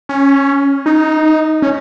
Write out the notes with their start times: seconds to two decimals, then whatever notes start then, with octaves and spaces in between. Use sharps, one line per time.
0.09 C#4
0.86 D#4
1.62 C#4